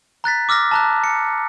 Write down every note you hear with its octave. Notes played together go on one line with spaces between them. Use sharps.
A#5 F#6 A6 B6
D6 E6 F6 A#6
A5 A#5 F#6
C#7